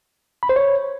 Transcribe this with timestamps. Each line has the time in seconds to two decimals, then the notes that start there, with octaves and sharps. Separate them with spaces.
0.43 B5
0.49 C5
0.56 C#5